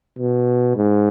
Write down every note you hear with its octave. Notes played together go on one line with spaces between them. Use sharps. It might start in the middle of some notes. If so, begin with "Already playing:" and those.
B2
G#2